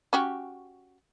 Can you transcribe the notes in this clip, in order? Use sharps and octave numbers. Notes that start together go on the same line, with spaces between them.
C#4 F#4 G4